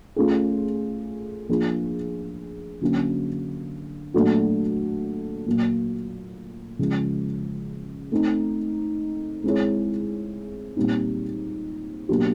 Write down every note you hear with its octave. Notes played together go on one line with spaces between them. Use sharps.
A3 C#4 F4 G#4
F3 A#3 D4 F4 G#4
D3 F#3 A#3 C#4
A#2 F#3 A3 D4 F#4
A#2 F#3 A#3
C#3 F3 G#3
A3 C4 D#4
G#3 C4 E4 G#4 C#5
A#2 G3 C4 D#4
B2 F#3 A#3 D4 G4